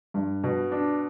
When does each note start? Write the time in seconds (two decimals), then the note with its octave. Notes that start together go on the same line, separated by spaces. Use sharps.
0.14 G2
0.43 B2
0.72 D4